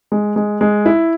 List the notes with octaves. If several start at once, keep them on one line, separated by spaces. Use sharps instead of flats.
G#3
G#3
G#3
E4